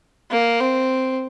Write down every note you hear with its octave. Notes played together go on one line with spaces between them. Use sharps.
A#3
C4